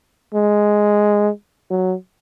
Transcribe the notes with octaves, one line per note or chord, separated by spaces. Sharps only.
G#3
F#3